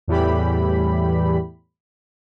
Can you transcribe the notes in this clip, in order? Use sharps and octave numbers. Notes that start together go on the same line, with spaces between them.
E2 A2 E3 G3 G4 B5